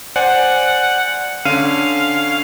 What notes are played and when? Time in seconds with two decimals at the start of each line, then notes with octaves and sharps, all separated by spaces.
0.16 C5 D5 F#5 G#5
1.45 D3 C#4 F5 D#7